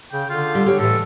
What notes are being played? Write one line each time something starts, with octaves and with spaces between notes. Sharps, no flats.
C#3 G5
D3 F4
G3
G4 C#5
A2 E3 A4